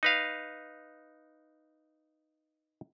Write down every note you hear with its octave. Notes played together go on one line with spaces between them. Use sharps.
D#4 B4 F5